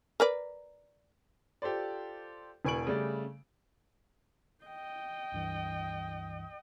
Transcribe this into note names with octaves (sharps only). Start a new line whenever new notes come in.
A#4 B4 D5
F4 G4 A4 C5 D5
E1 B4 G#5 C#6 D7 F#7
C#3 G3 A3 D5
D#5 G5
C#2 G2 E3